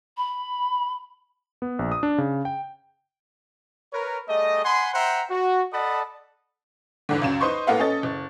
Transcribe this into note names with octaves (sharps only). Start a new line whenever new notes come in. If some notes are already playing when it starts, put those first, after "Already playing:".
B5
B3
A#1
D#6
D4
C#3
G5
A#4 B4 C#5
G3 A3 G#4 D#5
F#5 G#5 B5 C6
C5 E5 F#5 G5 A#5 C6
F#4
A4 D5 D#5 F#5 A5 B5
E2 G#2 D3
C#2 F#2 E7
D#4 B4 C5 D#5 C6 C#6
A2 A#3 B3 A4 F5 F#5
C#4 A4 D#5 A6
F#1